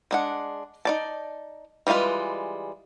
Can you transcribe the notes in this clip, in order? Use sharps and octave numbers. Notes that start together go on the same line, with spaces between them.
G#3 D4 F#5
D#4 D5 A5
E3 G3 G#3 F4 B4